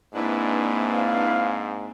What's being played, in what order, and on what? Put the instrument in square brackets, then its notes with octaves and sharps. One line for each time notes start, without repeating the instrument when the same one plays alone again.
[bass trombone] G#2 [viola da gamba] A#3 C4 [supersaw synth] D4 E4 B4
[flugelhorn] F5